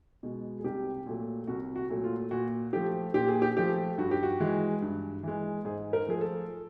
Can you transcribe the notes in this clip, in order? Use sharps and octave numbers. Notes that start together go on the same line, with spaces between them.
B2 G#3
G#4
C2 G4
A#2 F#3 A3
C2 F#4
F#4
A#2 F#3 A3
F4
A#2 F#4
F3 A3 G4
A#2 G4
G#4
G4
F3 A3 G4
G2 F#4
G4
F#4
E3 G#3
G2
E3 G#3
G#2 G#4
A#4
F3 A3 G#4
A4